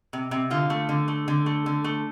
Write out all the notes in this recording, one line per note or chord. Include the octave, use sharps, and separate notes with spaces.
C3
C3
D3 F4
A3
D3
A3
D3
A3
D3
A3